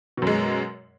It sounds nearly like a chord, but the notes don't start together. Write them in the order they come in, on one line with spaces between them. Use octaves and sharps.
B2 F#2 G#3